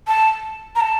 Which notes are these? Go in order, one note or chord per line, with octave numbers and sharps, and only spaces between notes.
A5
A#5
A5